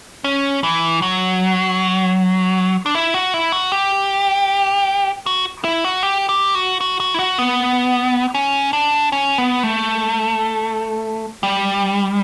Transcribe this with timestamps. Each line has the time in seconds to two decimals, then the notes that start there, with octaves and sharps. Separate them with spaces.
0.24 C#4
0.64 E3
1.02 F#3
2.86 D4
2.95 E4
3.14 F#4
3.34 E4
3.52 F#4
3.72 G4
5.26 F#4
5.64 E4
5.85 F#4
6.03 G4
6.29 G4
6.55 F#4
6.81 F#4
7.00 F#4
7.14 E4
7.19 F#4
7.38 B3
8.34 C#4
8.73 D4
9.12 C#4
9.38 B3
9.63 A3
11.43 G3